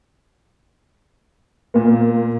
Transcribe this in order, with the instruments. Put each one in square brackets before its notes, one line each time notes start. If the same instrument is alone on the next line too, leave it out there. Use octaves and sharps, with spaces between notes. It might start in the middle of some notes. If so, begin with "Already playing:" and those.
[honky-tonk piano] A#2 A#3